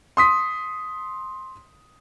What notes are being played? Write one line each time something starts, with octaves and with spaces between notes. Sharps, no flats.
C6 D#6 B6